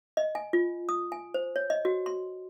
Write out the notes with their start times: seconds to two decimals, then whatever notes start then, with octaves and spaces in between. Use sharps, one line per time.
0.17 D#5
0.35 G#5
0.53 F4
0.89 D#6
1.12 G#5
1.34 C5
1.56 C#5
1.70 D#5
1.85 F#4
2.06 C6